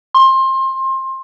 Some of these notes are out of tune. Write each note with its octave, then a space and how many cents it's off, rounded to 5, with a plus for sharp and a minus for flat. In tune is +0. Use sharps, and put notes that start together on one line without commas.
C6 +25